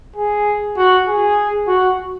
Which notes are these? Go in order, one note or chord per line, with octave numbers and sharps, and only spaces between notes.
G#4
F#4
G#4
F#4